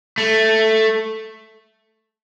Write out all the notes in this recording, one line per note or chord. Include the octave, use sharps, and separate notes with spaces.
A3